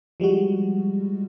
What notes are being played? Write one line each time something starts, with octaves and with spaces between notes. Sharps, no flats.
F3 G3 G#3 F#4